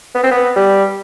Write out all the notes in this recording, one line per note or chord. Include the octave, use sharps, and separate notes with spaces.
B3
C4
B3
G3